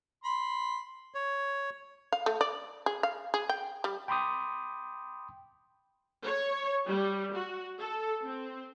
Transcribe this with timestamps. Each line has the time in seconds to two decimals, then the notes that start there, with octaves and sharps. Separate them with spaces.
0.24 B5 C6
1.14 C#5
2.12 F5
2.26 A3
2.41 D5
2.86 G#4
3.03 F5
3.34 G#4
3.49 G5
3.84 G3
4.08 G5 B5 C6 D6 D#6 G6
6.25 C#5
6.87 G3
7.34 F#4
7.79 A4
8.24 C4